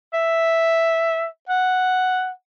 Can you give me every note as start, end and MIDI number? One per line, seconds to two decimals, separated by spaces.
0.14 1.26 76
1.49 2.29 78